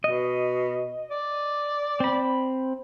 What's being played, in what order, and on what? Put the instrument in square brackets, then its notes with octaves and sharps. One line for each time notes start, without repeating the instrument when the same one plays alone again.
[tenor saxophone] B2 [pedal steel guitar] D#5
[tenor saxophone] D5
[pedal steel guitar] C4 B5